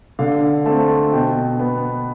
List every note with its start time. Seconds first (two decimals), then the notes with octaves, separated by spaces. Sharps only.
0.19 D3 F5
0.66 A3 C4 A5
1.12 B2 G5
1.59 B3